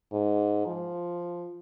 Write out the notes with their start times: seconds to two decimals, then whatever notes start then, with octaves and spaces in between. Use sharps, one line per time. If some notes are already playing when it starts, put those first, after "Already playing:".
0.12 G#2
0.67 F3